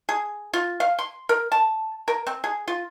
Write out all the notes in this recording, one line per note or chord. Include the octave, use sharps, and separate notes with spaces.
G#4
F4
F5
C6
A#4
A5
A#4
C4
G#4
F4